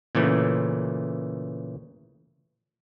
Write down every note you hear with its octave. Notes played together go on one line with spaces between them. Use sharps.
A#2 C#3 E3 A3